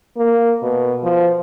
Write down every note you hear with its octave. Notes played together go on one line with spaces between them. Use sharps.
A#3
B2
F3